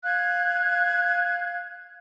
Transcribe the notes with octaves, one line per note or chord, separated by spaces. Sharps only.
F5 F#6 G#6